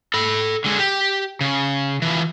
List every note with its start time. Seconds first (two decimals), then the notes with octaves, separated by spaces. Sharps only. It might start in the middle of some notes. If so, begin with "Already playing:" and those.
0.14 A4 B5
0.64 D3 G#3
0.79 G4
1.41 C#3
2.02 E3 F3